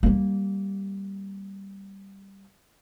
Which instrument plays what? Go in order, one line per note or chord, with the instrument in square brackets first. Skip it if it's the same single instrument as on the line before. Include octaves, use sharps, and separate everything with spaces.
[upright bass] G3 A#3